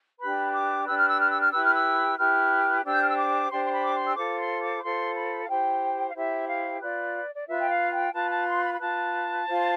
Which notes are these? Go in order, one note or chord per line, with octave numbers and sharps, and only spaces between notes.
D4 G4 B4 B5
D6
D4 G4 B4 E6
F6
E6
F6
E6
F6
E4 G4 B4 E6
F6
E6
E4 G4 B4 F6
D4 G4 C5 E6
G6
F6
E6
D6
D4 G4 C5 C6
C6
B5
D6
C6
E6
F4 A4 C5 D6
C6
D6
B5
F4 A4 C5 C6
B5
F5
E4 G4 C5 G5
F5
E4 G4 C5 E5
F5
F4 B4 D5
D5
F4 B4 E5
G5
F5
G5
F4 B4 A5
A5
C6
B5
B5
F4 B4 A5
F4 C5